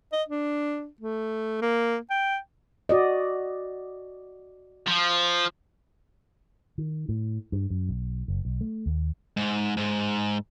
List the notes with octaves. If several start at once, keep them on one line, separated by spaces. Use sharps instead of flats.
D#5
D4
A3
A#3
G5
F#4 D5 D#5
F3
D#3
A2
G2
F#2
B1
F#1
B1
A3
D#2
G#2
G#2